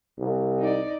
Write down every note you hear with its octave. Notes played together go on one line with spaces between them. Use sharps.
C2
D#4 D5